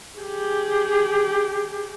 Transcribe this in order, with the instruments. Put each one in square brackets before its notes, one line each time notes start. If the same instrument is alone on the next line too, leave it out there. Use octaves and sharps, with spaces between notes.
[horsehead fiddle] G4 G#4